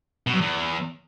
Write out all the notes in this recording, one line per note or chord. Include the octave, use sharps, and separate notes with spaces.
B2
F#2
E2